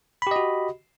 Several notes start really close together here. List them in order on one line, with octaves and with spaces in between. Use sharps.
B5 G4 D#5 F#4